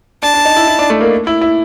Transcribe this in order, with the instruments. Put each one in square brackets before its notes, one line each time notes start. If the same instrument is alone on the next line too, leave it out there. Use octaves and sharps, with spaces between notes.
[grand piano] D4 [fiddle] A5
[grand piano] D4
D#4
E4
E4
D4
A3
A#3
E4
E4